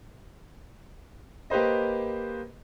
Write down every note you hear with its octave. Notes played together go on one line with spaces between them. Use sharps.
A#3 G4 B4 C5 D#5